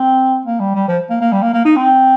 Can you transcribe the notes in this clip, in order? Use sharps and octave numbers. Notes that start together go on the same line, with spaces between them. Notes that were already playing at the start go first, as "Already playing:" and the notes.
Already playing: C4
A#3
G3
G3
F3
A#3
A#3
G3
A#3
A#3
D#4
C4